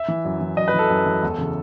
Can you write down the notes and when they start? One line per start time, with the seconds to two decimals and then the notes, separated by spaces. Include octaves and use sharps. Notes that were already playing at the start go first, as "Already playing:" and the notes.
Already playing: E5
0.08 E3
0.25 F#2
0.41 E3
0.57 F#2 D#5
0.68 B4
0.74 E3 A4
0.90 F#2
1.06 E3
1.23 E2
1.38 C#3 E3